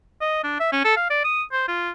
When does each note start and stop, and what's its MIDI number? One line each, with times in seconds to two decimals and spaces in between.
0.21 0.43 75
0.44 0.57 62
0.60 0.71 76
0.72 0.81 61
0.85 0.96 69
0.96 1.08 77
1.10 1.23 74
1.24 1.43 87
1.52 1.64 72
1.68 1.90 65